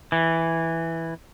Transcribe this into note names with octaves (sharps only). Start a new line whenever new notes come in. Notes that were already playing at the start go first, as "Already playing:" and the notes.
E3